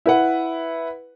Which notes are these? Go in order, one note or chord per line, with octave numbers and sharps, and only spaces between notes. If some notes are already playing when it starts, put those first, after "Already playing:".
E4 B4 F#5